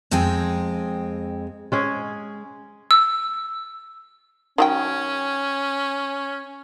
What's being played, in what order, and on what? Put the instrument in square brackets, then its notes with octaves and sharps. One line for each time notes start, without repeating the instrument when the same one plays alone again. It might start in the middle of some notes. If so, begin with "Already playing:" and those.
[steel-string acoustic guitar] F2 G#3 C4 G5 G#5
[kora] G#3 C#4 G#4
[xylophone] E6
[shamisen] D#3 F#3 G5 [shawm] C#4